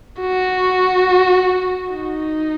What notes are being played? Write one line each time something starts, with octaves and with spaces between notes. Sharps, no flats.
F#4
D#4